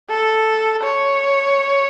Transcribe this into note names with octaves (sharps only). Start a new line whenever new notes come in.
A4
C#5